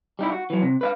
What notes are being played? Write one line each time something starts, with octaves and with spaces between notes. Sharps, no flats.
G3 D#4 E4
F#4
E3 F#3
C3
B4 E5 F5